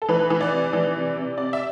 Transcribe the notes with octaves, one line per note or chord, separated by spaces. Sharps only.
A4
E3 B4
E3
D5
C3
E3
C3
C3
C3 D5
E5